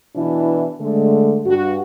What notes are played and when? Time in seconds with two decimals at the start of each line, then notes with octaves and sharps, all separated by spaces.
0.16 B2 E3 D4 E4
0.81 D3 G#3 A3
1.46 G2 F#4